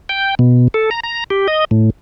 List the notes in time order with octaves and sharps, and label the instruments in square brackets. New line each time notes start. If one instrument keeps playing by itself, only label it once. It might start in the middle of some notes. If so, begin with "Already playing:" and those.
[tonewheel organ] G5
B2
A4
A#5
A#5
G4
D#5
A2